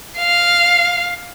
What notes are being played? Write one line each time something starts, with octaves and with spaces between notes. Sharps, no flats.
F5